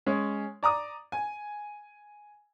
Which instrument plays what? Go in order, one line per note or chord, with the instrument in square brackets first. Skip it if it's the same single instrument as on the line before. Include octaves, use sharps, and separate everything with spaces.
[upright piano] G#3 C#4
D5 A#5 D6 D#6
G#5